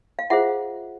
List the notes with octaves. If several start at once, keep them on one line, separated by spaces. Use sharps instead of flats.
F5
F4 G#4 C5 E5 F#5